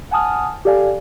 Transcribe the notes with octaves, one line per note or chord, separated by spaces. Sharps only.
F#5 G#5 A5 D#6 F6
G4 A4 D5 F5 G#5